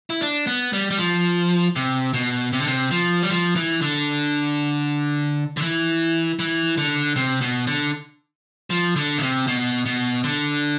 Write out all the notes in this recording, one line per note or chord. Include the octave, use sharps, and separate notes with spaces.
E4
D4
B3
G3
G3
F3
C3
B2
C3
D3
C3
F3
G3
F3
E3
D3
D3
E3
E3
D3
C3
B2
D3
F3
D3
B2
C3
B2
B2
D3